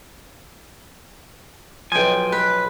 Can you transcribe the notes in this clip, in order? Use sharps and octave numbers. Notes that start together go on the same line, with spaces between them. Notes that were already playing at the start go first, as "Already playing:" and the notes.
B1 F3 G5 G#5
B4